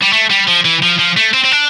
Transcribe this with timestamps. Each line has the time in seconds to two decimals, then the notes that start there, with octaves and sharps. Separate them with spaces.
0.03 G3
0.13 A3
0.30 G3
0.48 F3
0.65 E3
0.83 F3
0.99 F3
1.17 A3
1.33 C4
1.44 C4
1.51 D4